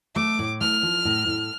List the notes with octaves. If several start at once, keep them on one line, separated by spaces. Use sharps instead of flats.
A3 D6
A2
A3 F6
F3
A2
A2